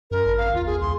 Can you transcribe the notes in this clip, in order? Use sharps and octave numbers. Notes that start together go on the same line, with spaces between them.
F#2 A#4
G#1
F5
E2 F4
G#4
C#2 C6